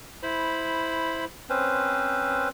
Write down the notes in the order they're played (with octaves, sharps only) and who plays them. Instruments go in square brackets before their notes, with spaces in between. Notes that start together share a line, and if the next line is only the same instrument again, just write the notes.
[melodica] E4 C5 B5
C4 C#4 B4 C5